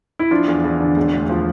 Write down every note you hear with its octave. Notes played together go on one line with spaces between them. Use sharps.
E4
F3 D4 F4
E2
E2
D3
E1
D2
F3